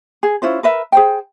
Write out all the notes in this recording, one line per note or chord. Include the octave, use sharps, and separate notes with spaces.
G#4
C#4 E4 F4 C5
A#4 B4 E5
G#4 C5 G5